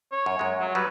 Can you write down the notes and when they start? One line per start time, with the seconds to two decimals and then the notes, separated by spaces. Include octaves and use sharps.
0.12 C#5
0.26 F#2
0.39 F#2 G#3
0.60 F#3
0.75 F#3 G3 B4